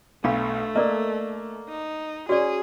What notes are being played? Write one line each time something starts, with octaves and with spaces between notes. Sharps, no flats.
B1 A3 D4 F5 B5
A#3 A#4 D5 D#5
D#4
C#4 F#4 G#4 D5